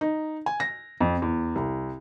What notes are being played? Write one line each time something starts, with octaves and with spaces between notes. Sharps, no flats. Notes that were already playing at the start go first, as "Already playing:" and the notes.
D#4
G#5
A#6
F2
E2
C2